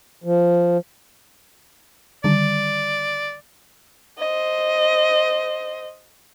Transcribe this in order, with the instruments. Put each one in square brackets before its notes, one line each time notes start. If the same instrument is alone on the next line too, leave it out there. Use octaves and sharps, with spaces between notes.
[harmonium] F3
[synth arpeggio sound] D3 D#3 G3 [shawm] D5
[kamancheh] C5 D#5